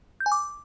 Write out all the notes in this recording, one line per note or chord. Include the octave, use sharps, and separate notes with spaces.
G6
G#5
D6